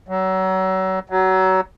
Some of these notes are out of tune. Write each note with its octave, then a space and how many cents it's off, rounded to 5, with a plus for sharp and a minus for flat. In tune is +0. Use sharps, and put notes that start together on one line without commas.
F#3 +30
F#3 +25